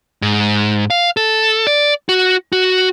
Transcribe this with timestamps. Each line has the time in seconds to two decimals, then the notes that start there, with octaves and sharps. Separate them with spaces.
0.22 G#2
0.90 F5
1.17 A4
1.67 D5
2.09 F#4
2.52 F#4